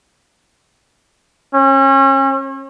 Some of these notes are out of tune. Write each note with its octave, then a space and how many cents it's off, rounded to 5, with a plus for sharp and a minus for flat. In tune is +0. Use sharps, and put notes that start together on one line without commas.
C#4 -35